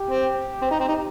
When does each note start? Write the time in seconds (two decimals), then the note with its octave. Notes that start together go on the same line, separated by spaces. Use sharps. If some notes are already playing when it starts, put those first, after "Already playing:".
Already playing: G4
0.10 C4
0.62 C4
0.71 D#4
0.80 C4
0.88 D#4